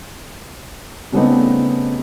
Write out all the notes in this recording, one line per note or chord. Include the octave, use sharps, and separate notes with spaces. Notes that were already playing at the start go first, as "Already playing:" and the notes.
C#3 G3 A3 B3 C4 D#4